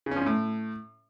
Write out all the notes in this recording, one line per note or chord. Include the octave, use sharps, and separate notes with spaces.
C#3
C#4
F3
C#4
A2